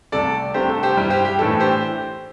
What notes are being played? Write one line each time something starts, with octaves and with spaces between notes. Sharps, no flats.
C2 C3 A3 A4 D5
C2 C3 A3 D4 G4 C5
A4
G4 C5
G2 G3 E4
G4 C5
G4
A2 E3 A3 D4 A4
G4 C5